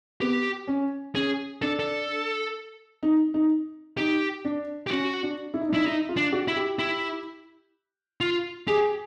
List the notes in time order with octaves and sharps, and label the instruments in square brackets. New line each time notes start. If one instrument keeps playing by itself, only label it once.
[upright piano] B3 [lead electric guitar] G4
[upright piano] C#4
[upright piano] C#4 [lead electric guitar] G#4
[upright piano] D4 [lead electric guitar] A4
[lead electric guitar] A4
[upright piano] D#4
D#4
[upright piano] D#4 [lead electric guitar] G4
[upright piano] D4
[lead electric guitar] G4
[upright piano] C#4 [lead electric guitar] F#4
[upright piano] D4
E4
D#4
D4
[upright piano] D#4 [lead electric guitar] E4
[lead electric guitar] D#4 [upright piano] E4
[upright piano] F4
[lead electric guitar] D4
[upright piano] F#4
[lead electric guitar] E4
[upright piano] G4
[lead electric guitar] E4
F4
[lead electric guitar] G4 [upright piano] G#4